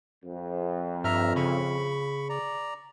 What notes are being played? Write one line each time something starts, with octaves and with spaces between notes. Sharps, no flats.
F2
G2 E5 A#5 F6
C#3 B5 C#6
D5 A#5